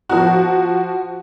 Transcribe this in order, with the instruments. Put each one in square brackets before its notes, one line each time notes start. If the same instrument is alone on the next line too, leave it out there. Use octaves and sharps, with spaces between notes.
[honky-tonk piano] F3 F#4